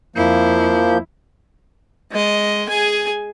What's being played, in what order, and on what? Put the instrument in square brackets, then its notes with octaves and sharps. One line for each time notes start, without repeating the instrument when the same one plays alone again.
[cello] F2 E4 [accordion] F3 A#3 G6
[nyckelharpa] G#3 D#5
G#4 G#5